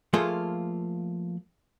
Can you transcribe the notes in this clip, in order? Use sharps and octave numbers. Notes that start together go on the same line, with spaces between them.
F3 A3 A#3 F4 G#4 A4